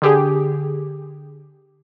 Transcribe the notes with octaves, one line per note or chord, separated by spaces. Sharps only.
D3 G4 G#4